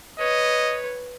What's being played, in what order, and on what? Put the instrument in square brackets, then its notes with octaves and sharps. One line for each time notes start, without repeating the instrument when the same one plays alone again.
[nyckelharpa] B4 C#5 [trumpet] D#5